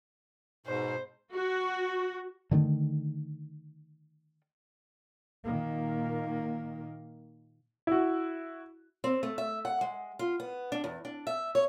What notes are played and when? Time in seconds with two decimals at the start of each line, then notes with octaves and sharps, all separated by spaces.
0.66 G#2 B2 C5
1.34 F#4
2.51 D3 D#3 G#3 A3
5.46 A#2 D#3 A#3
7.87 E4 F#4
9.04 C4
9.23 A3
9.38 E5
9.65 F#5
9.81 G#3
10.19 F4
10.40 B3
10.72 D4
10.84 E2
11.05 D4
11.27 E5
11.55 C#5